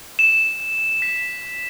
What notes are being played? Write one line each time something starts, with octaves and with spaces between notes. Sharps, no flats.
E7
B6